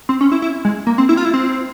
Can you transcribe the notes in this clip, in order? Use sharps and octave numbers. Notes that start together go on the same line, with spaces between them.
C4
C#4
E4
E4
G#3
A#3
C4
E4
F4
E4
C4